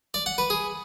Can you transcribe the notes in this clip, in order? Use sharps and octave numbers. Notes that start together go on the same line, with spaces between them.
D5
F#5
B4
G#4